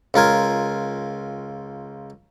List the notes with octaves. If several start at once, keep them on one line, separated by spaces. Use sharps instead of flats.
C#2 F4 A#4 G#5